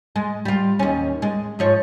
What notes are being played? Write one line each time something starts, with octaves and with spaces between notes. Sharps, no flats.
G#3
G3 F4
D#2 C#4
G#3
G#2 F3 C#5